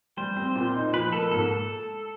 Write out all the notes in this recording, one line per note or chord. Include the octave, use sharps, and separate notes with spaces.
G3 C5
C4
A#2
D#4
F3 B4
A#3 A4
G#2 A4
A4